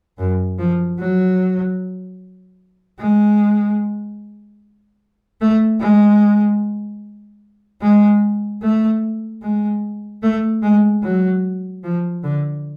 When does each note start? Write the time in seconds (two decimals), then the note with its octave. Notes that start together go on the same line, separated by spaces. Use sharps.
0.18 F#2
0.59 F3
0.99 F#3
2.99 G#3
5.41 A3
5.80 G#3
7.82 G#3
8.62 A3
9.42 G#3
10.23 A3
10.62 G#3
11.03 F#3
11.83 F3
12.23 D3